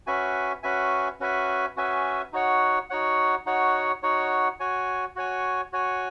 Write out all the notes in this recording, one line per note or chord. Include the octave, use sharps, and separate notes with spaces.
C#4 F#4 B4 E5 G#5
C#4 F#4 B4 E5 G#5
C#4 F#4 B4 E5 G#5
C#4 F#4 B4 E5 G#5
D#4 F#4 C#5 F#5
D#4 F#4 C#5 F#5
D#4 F#4 C#5 F#5
D#4 F#4 C#5 F#5
F#4 C#5 G#5
F#4 C#5 G#5
F#4 C#5 G#5